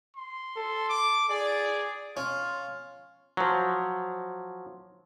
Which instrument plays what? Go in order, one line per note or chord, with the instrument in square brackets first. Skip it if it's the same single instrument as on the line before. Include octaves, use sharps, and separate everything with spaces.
[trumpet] C6
[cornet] A4
[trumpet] D6
[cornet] G#4 [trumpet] D5
[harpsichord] C#4 [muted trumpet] F4
[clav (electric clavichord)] F3 F#3